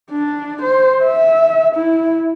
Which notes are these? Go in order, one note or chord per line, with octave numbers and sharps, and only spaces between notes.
D4
C5
E5
E4